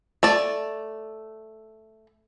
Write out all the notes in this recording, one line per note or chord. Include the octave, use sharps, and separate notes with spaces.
A3 D5